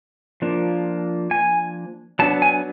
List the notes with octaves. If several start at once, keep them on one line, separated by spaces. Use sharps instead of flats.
F3 A#3 D4
G#5
F#3 B3 D4 A5
G#5